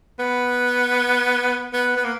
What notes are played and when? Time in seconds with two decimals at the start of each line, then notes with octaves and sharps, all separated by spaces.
0.19 B3
1.73 B3
1.96 B3
2.04 A#3